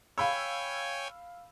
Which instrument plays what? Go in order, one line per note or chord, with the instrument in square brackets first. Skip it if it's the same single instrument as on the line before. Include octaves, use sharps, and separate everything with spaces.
[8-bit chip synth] C#5 G5 G#5 [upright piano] F5 B5 E6